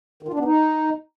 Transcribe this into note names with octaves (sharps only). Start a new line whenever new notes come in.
D#3
F4
D4
B3
D#4